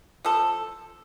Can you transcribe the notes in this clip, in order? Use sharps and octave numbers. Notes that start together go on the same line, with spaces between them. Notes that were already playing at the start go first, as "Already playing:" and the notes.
F3 A4